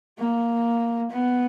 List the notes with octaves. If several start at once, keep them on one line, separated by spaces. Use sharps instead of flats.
A#3
B3